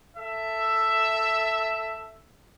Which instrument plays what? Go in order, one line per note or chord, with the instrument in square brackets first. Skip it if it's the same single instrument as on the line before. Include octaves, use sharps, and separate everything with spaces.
[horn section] A4 E5